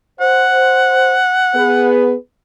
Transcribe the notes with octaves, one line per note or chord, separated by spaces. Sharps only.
C5 F#5
B3 G#4 B4